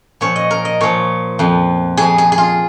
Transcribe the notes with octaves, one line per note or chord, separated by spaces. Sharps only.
A#2 F3 C#5
D#5
A#4
D#5
A#2 F3 C#5
F2 F3
F2 F3 G#4
G#4
G#4
F4